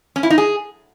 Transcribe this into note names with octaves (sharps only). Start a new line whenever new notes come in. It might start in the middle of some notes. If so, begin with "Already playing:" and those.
C#4
E4
D#4
G#4